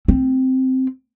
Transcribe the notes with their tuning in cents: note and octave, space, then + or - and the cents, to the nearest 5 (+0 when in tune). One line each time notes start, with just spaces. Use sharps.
C4 -5